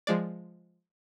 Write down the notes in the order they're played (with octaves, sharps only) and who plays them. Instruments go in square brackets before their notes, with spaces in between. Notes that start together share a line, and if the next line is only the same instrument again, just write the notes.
[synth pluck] F3 G#3 D5